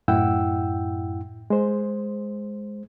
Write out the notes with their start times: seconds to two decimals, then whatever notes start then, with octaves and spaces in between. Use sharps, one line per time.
0.08 F#2 A2 E4 F#5 G5 E6
1.50 G#3 C5